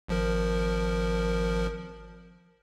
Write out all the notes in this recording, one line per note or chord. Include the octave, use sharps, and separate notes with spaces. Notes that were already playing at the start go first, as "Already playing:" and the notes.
G#1 F3 A#4